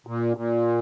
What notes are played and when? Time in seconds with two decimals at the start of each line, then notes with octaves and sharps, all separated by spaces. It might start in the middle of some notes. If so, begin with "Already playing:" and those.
0.07 A#2
0.37 A#2